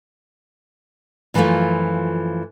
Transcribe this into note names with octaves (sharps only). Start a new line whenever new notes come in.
F#2 E3 F3 G3 A3 F4